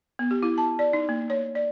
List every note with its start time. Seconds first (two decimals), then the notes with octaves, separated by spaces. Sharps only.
0.19 B3
0.31 G4
0.43 E4
0.58 A5
0.79 D5
0.93 D#4
1.09 A#3
1.30 C#5
1.55 D5